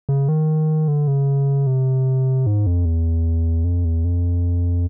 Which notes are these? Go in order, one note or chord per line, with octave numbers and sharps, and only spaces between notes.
C#3
D#3
D3
C#3
C3
G#2
F2
E2
F2
E2
F2